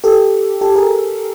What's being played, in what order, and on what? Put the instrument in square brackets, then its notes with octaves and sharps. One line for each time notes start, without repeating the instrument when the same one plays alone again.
[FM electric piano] G4 A4
G4 A4
G#4 A#4